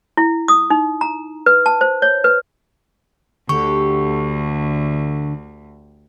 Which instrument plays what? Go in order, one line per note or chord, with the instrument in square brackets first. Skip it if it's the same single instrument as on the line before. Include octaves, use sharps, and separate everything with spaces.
[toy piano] E4
D#6
D#4
A#5
B4
A5
C5
C#5
B4
[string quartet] D2 [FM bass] D3 [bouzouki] G4 [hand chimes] C#6